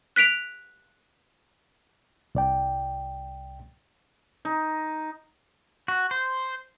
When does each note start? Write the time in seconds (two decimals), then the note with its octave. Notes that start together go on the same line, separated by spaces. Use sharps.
0.16 F#6 B6 D7 F7
2.35 C2 D5 G5
4.45 D#4
5.88 F#4
6.11 C5